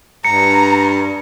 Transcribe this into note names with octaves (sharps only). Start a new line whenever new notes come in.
G2 A#5 C#7